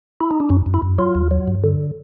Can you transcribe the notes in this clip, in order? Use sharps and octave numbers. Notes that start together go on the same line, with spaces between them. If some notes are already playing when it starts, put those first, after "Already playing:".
E4
D#4
D4
F#2 C#4
F#2
E4
F#2
F#3 F4
D#2
F#3
G2
D3